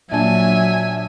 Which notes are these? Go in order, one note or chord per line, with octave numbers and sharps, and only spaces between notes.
A#1 F#3 D4 E5 G#5 A5